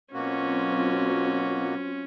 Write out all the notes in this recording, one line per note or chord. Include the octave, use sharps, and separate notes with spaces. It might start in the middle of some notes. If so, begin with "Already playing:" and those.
B2 F#3 A#3 C4 C#4 F4 F#4